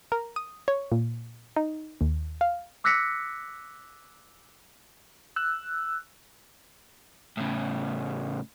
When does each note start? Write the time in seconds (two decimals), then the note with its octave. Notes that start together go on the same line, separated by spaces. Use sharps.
0.12 A#4
0.36 D#6
0.68 C#5
0.92 A#2
1.56 D#4
2.01 D#2
2.41 F5
2.84 D6 E6 F#6 A#6 B6 C#7
5.36 E6 F#6
7.37 A2 C#3